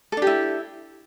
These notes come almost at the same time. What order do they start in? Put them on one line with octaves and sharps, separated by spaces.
A4 D4 G4 E4